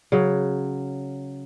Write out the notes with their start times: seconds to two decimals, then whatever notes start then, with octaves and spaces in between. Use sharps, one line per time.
0.12 C#3 F#3